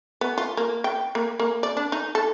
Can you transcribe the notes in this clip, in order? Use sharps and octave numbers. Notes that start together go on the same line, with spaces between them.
B3
F4
A#3
G5
A#3
A#3
D5
D4
D#4
A4